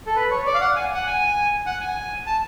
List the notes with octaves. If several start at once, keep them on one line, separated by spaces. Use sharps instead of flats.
A4
B4
C#5
D5
F5
F#5
G#5
F#5
G#5
F#5
G#5
A5